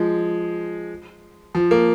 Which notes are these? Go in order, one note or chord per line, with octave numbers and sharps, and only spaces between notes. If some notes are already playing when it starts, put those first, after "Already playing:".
Already playing: F3 G#3
F3
A#3